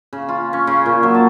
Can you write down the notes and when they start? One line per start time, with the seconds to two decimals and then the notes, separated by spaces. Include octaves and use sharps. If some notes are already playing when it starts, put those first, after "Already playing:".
0.13 C#3
0.29 F4
0.53 C#4
0.67 C#3
0.86 A#2
1.03 F#3
1.14 A5